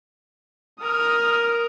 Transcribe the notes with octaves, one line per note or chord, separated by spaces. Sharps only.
A#4 D#6 F6